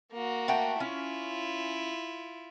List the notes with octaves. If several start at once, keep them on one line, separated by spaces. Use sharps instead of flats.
A#3 F#4
A3 F#5 G5
C#4 E4 F4